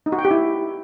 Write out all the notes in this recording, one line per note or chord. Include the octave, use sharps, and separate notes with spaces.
D#4
F#4
G5
G4
E4